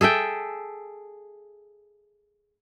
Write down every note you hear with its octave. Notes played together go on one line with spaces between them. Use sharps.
G#4 A4 E5 G5